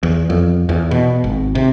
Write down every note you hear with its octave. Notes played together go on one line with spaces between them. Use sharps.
E2
F2
E2
B2
G#1
C3